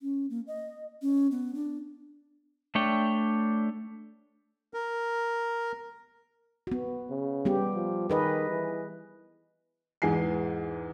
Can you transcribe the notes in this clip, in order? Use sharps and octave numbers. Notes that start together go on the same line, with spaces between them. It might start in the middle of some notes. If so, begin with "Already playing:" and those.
C#4
A#3
D#5
C#4
B3
D4
A3 D4 C#5 G5
A#4
B3 F#4
C#3
G3 B3 G4
F3
D#3 G#4 B4 D#5
E3
E2 G#2 E3 G#5 C7